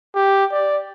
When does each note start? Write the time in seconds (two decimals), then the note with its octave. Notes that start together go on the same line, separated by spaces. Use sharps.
0.15 G4
0.52 D5